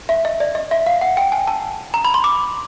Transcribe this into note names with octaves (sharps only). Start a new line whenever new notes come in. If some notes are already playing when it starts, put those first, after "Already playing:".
E5
D#5
D5
D#5
E5
F5
F#5
G5
G#5
A5
A#5
B5
C6
D6